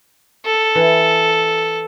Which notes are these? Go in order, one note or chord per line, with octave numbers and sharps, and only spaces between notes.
A4
E3